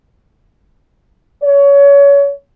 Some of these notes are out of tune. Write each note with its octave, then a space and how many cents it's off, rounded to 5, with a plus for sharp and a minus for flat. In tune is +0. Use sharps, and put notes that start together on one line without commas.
C#5 +25